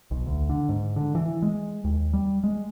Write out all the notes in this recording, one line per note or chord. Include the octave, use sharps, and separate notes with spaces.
B1
D2
D3
G#2
D3
E3
G#3
D#2
G3
G#3